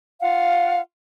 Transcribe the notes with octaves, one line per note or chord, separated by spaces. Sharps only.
F4 F5 F#5